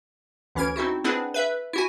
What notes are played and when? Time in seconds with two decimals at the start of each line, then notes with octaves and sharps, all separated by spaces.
0.55 D2 E3 C#4 F6 G#6 D7
0.76 C4 D#4 E4 F#4
1.04 C4 D4 E4 G#4 B4 F#5
1.34 B4 E5
1.73 E4 F#4 G#5